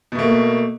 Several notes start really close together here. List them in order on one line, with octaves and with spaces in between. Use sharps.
B2 A3 A#3